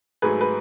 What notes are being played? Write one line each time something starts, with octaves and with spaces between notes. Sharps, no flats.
G#2 F#3 A3 G#4 B4
B4